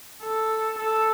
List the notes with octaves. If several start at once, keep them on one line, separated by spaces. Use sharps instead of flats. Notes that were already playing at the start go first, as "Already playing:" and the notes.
A4
A4